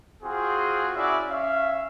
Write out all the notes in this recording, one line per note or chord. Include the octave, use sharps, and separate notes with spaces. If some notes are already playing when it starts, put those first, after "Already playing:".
C4 F4 F#4 G#4
C#4 E4 F#4 G#4 D5 E5
C#4 E5 F5